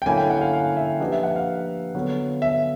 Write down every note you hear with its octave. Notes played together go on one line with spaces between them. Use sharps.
G5
D3 F#3 A#3 C#4 E4 G#5
G5
F#5
F5
F5
E5
F3 A#3 D4 G4 B4 D#5
E5
F#5
F5
D3 F#3 B3
E5